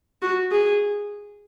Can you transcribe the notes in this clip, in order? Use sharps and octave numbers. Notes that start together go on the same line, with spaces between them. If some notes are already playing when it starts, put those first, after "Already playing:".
F#4
G#4